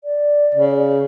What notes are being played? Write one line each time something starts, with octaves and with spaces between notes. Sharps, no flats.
D5
C#3